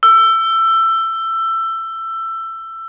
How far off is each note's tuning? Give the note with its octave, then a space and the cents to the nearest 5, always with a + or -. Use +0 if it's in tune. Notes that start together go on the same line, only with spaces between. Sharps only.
E6 +20